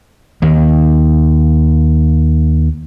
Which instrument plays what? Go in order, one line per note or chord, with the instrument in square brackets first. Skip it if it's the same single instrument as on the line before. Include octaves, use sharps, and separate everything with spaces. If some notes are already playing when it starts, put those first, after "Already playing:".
[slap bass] D#2 D#3